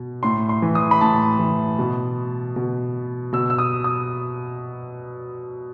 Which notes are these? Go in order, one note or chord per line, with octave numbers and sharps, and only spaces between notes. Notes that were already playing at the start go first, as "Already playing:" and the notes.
Already playing: B2
A2 C6
C6
E3
D#6
B5
A2 A5
E3
B2
B2
B2 E6
E6
D#6
D#6